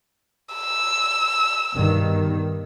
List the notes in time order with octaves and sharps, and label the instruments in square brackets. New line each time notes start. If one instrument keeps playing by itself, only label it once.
[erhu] E6
[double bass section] G2 B2 D#3